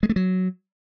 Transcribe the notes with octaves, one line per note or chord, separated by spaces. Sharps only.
G#3
A3
F#3